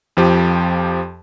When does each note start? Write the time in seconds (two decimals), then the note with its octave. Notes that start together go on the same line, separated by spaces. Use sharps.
0.17 F2 F3 G4